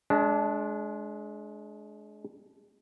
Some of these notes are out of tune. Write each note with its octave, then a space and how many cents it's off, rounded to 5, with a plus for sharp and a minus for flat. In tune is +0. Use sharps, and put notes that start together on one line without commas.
G#3 +25 D4 -15